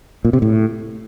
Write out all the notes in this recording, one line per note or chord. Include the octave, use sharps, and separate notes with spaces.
A#2
C3
A2